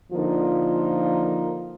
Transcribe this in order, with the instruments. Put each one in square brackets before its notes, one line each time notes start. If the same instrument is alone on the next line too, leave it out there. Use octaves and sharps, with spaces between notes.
[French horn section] D3 F3 A#3 D#4 F4